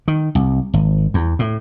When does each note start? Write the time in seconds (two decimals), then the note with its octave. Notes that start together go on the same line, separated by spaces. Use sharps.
0.08 D#3
0.35 C2
0.74 G#1
1.14 E2
1.39 A2